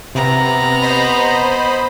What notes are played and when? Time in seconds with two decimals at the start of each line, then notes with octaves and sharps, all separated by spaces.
0.15 C3 B3 A#5
0.82 C5 D#5 B5